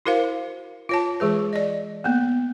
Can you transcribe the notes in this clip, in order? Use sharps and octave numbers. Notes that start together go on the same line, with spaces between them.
E4 F#4 A#4 C5 F5
F4 C#5 A5
E3 G#3 G#4 B4
D5 D#5
A#3 B3